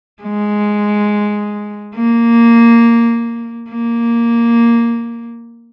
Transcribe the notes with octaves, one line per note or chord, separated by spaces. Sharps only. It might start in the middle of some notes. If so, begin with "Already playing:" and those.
G#3
A#3
A#3